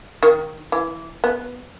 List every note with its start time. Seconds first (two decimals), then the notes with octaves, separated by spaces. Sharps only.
0.23 D#3
0.72 E3
1.24 B3